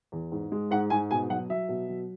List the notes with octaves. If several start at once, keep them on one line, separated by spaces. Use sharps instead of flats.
E2
G#2
G#3
G#2 F#5
G#2 G#5
B2 G#5
F#3 F#5
F#3 E5
B2
F#3